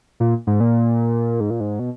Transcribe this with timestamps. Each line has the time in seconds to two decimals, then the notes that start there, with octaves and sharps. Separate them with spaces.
0.20 A#2
0.47 G#2
0.60 A#2
1.40 G#2
1.50 A#2
1.60 G#2
1.79 B2